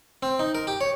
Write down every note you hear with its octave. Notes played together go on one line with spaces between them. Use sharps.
C4
D#4
A#4
G4
C#5